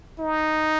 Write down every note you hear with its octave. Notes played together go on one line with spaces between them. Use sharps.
D#4